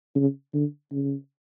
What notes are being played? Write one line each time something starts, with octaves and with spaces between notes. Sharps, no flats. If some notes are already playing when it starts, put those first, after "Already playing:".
C#3
D3
C#3